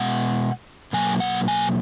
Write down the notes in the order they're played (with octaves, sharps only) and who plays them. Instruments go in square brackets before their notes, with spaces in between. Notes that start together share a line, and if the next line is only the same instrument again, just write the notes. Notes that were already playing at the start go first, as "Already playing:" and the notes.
Already playing: [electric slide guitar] B2 G#3 B3 F#5
B2 F#3 A#3 G#5
F#5
G#5